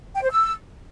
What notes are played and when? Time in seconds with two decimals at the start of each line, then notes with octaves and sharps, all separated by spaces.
0.15 G5
0.23 C5
0.31 E6